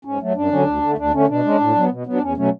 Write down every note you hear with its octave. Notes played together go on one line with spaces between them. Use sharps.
G#2 C#4
F#3 A3
F#2 D4
D3 F#3 C#4
D2
D3 A3
D2 D4
D3 A3 C#4
B2 D4
G#3 C#4
A2
F#3 B3
B2
F#3 B3
D4
E2 C#4
B2 F#3 A3 C#4